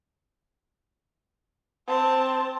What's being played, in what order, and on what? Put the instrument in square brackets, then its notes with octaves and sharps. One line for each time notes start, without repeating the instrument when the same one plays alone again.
[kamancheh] C4 A5